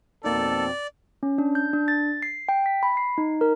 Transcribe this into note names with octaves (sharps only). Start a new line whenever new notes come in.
F2 B2 A#3 C4 D#4 A4 D5
C#4
D4
G6
D4
A6
C7
G5
B6
B5
C7
D#4
A#4